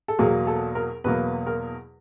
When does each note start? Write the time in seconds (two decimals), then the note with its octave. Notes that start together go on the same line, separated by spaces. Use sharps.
0.08 A4
0.19 E2 B2 F#3 A#3 G#4
0.47 A4
0.75 A#4
1.04 E2 B2 F#3 A#3 B4
1.47 A#4